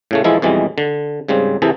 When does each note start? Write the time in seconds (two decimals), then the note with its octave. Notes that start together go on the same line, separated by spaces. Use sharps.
0.11 A2 C#3 A3
0.24 E3 F3 G#3 E4 G#4 A4
0.42 F2 B2 E3 G3 G#3
0.78 D3
1.28 G#2 C#3 G3 C4
1.62 C3 E3 E4 G#4 A4